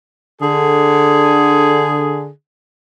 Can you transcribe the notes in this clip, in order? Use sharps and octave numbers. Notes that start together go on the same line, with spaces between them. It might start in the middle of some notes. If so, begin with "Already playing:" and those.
D3 G#4